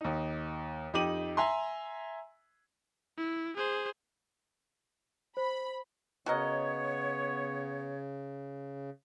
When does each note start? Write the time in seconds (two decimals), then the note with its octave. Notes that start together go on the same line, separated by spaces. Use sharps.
0.01 D#2 D#4
0.93 F2 D#4 G4 D6 D#7 F#7
1.37 E5 G#5 A#5 C6
3.17 E4
3.56 G#4 C5
5.37 C5 B5
6.26 C#3 B3 F#4 A#4 C#5 D#5